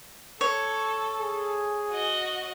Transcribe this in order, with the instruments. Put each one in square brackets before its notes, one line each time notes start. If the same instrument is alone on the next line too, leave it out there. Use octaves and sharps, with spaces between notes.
[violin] A4 [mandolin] C#5
[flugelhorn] G#4
[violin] F#4 D#5